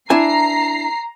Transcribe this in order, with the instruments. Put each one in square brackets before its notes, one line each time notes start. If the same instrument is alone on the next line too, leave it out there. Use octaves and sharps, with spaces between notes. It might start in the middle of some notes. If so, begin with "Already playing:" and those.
[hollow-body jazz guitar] D4 E4 G#5 [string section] A#5 C7